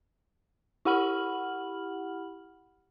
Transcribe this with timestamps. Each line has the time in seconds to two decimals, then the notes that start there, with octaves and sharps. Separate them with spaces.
0.85 E4 G4 F#5 B5 F6 F#7